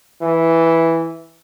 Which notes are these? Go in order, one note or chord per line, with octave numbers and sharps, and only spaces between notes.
E3